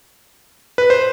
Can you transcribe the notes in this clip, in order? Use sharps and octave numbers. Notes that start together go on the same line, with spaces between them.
B4
C5